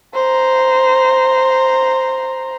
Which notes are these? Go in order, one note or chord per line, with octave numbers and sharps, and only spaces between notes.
C5 A#5